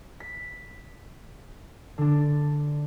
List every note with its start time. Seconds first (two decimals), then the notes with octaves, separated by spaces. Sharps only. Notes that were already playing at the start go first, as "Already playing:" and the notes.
0.20 B6
1.98 D3 D4